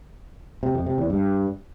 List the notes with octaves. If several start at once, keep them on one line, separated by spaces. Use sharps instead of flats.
C3
F2
C3
E2
G2